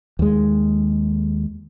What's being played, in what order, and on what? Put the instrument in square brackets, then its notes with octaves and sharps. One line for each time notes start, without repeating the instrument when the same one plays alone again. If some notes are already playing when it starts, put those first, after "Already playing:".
[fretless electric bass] D#2 G#3